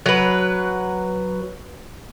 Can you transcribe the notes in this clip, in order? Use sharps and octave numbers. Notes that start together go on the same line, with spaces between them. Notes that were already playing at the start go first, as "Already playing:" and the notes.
F#3 B4